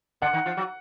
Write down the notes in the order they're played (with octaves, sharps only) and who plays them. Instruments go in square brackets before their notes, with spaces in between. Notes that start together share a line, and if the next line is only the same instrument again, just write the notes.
[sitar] D3 D4 [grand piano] F#5
[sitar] D#3 D#4
F3 F4
F#3 F#4